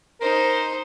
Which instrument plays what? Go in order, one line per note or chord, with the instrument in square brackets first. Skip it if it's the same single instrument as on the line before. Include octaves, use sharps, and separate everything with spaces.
[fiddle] D#4 C5 [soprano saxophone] A#4